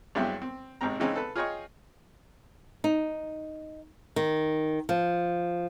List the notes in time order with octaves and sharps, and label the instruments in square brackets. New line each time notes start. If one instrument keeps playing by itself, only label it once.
[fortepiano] G2 F#3 G#3 C4 E4 G4
C4
G#1 G#2 C3 C4 A#5
C#3 E3 G#3 C4 C#4 D#4
A4 B4
F4 G#4 C#5 D#5 G5 C#6
[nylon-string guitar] D#4
D#3
F3